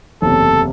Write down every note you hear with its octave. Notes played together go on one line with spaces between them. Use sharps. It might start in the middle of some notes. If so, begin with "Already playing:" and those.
F#1 E2 C3 A4